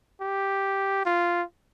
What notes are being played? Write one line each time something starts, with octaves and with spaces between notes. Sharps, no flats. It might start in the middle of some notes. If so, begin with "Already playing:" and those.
G4
F4